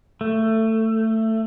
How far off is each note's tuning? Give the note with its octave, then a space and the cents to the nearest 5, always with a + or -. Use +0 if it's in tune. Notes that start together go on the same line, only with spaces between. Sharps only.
A3 +15